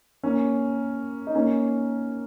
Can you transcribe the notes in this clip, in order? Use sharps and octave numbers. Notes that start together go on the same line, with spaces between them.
A#3 C#4
D#4
A#3 C#4